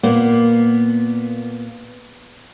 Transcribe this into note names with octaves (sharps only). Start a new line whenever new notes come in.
A#2 A#3 B3